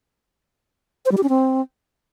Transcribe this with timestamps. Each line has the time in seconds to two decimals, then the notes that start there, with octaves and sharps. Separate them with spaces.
1.06 C5
1.11 G3
1.17 G4
1.23 C#4
1.29 C4